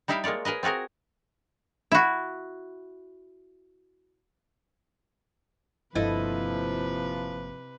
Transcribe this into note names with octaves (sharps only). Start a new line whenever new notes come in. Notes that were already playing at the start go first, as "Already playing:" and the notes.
G3 D#4 E4 E5 F5 G5
G#3 A#3 F4 C#5 D5
G#4 A#4 B4 D#5
C4 F4 F#4 G#4 A#4
E4 F#4
G1 C3 F3 A#3 E4 A4 B4 D#5